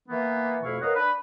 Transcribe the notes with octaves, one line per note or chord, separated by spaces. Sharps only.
E3 A#3 B3
F2 B2 A3 E4 F5 C#6
A#4 B4 C#5 D#5 F5 F#5
D4 B4